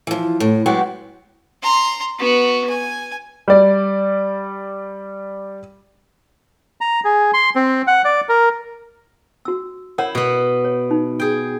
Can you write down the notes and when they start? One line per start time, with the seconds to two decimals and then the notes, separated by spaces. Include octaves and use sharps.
0.07 E3 F3
0.40 A2
0.66 F#3 G#3 B3 C4 F#4 G4
1.63 A#5 C6
2.19 B3 F#4
2.69 G#5
3.48 G3 D5
6.81 A#5
7.04 G#4
7.34 C6
7.56 C4
7.87 F#5
8.05 D5
8.29 A#4
9.45 F#4 E6
9.98 E4 A#4 C#5 F#5
10.15 B2 B3
10.64 C#5
10.91 D#4
11.20 G#4 G5